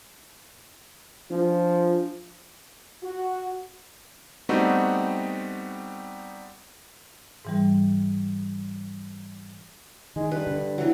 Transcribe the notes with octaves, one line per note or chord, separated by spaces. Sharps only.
F3 D4 F4
F#4
G3 A3 B3 C4 D#4 F#4
G#2 E3 G3
D#3 G#3
G2 B4
D3
E3 F#3